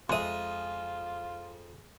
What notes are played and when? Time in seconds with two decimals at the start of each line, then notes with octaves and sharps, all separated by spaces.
0.10 F2 G#3 F4 E5 C6 D#6